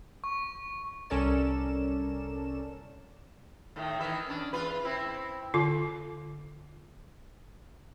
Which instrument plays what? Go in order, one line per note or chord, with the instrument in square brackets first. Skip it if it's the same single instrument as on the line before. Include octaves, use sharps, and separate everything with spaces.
[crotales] C#6
[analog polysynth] C2 C#4 A4 A#4 D5 E7
[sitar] A2 D#3 A3
D#3 E3 E5
C#4 D4
E2 F4 B4
C4 E4
[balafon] D3 F4 D6